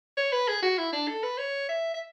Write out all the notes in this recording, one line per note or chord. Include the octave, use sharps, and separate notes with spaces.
C#5
B4
G#4
F#4
E4
D4
A4
B4
C#5
E5
E5